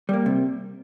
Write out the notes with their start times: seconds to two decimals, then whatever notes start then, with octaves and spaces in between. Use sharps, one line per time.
0.09 G3 A#3
0.26 C3